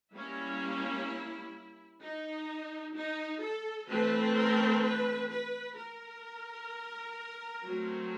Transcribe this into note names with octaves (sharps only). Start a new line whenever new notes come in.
G3 A#3 C#4 E4
D#4
D#4
A4
E3 A3 C4 B4
A#4
B4
B4
A#4
F#3 A3 C4